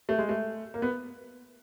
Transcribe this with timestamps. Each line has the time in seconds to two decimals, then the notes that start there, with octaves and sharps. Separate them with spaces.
0.09 A3
0.19 G#3
0.29 A3
0.74 A#3
0.82 B3